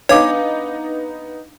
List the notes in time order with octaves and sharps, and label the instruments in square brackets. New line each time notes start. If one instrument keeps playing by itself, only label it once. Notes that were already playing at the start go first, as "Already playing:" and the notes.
[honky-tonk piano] B3 D#4 [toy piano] D4 F5 D6 [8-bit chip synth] C#5